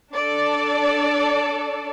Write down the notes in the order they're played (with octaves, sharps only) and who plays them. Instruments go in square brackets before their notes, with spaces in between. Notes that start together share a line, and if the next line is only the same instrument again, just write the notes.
[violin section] D4 A4 D5